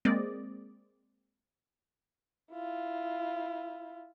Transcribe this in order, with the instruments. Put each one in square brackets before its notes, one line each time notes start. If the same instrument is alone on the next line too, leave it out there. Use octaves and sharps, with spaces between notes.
[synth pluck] G#3 A#3 C4 D5 D#5
[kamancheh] E4 F4